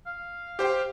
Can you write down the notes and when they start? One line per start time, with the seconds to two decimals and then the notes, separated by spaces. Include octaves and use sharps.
0.06 F5
0.59 G4 C5 G5